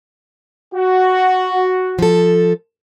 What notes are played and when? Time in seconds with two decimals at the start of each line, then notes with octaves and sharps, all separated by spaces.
0.73 F#4
1.99 F3 A4